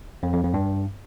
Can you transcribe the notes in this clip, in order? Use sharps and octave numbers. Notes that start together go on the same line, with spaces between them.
F2
F2
F2
G2